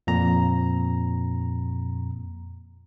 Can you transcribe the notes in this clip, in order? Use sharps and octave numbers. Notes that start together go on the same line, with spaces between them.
F2 A#2 A#5